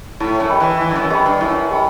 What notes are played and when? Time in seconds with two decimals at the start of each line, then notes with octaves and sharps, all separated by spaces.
0.20 A2 E4
0.40 F#2
0.50 G4 D#5 G5 B5
0.60 E3
0.80 E3 E4
0.91 G2
0.96 F#2
1.10 F#2 G4 D#5 G5 B5
1.26 G2
1.41 F#2 E4
1.71 G4 D#5 G5 B5